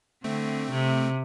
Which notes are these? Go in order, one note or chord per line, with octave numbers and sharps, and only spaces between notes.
D3 A3 C4
C3